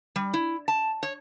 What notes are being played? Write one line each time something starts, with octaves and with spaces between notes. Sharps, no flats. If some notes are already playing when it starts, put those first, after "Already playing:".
G3
E4
A5
C#5